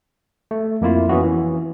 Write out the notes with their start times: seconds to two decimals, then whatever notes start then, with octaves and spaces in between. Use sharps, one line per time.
0.51 A3
0.81 F2 A#3 E4 F4
1.09 E3 B3 C#4 F#4
1.24 E3